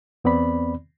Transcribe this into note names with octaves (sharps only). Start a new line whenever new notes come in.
E2 B3 C4 D5 B5